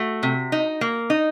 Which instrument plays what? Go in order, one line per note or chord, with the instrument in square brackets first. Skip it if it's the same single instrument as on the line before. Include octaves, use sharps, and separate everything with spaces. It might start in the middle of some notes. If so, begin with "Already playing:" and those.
Already playing: [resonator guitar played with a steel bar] A3 F#4
C3
D#4
A#3
D#4